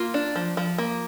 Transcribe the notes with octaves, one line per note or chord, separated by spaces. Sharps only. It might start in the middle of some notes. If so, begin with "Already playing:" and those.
Already playing: A#3 F4
D4
F3
F3
A#3